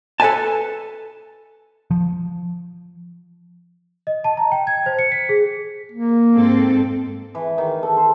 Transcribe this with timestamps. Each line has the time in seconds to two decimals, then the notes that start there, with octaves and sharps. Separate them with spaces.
0.20 A4 B4 E5 G#5 A5
1.91 F3
4.07 D#5
4.24 A5
4.37 A#5
4.52 G5
4.67 G#6
4.86 C5
4.99 C#7
5.12 B6
5.29 G#4
5.92 A#3
6.35 G#2 C4 A4
7.35 E3
7.58 D#3
7.83 A4
7.97 C5